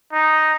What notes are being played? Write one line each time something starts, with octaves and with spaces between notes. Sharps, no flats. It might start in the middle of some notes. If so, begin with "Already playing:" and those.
D#4